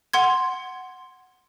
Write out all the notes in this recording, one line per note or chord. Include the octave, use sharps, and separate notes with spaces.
F#5 C6 G#6